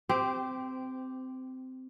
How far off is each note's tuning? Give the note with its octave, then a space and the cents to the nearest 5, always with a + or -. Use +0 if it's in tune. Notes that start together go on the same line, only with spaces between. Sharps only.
C4 -15 G4 +0 C5 -30